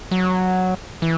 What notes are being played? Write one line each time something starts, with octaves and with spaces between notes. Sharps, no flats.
F#3
E3